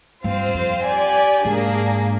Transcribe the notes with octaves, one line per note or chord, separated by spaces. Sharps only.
G2 C4 F4 C5 F5
F2
G4 D5 G#5
G#2 A#3 D4 G#4